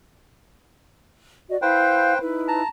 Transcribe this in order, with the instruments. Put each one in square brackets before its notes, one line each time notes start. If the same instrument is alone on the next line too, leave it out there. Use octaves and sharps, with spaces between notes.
[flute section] F#4 D5 D#5
[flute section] E4 F5 [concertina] B4 C5 G5
[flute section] D#4 E4 B4
[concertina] A5 A#5